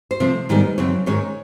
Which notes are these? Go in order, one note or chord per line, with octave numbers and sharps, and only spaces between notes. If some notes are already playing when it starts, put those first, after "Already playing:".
C5
C3 F3 A3 C4
G#2 D#3 G3 B3
F#2 C#3 F#3 C4 C#5
G#2 D#3 G#3 C#4 C#5